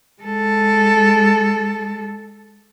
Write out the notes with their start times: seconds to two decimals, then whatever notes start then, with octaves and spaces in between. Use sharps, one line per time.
0.22 G#3 A4